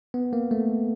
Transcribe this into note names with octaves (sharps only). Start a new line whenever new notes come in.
B3
A#3
A3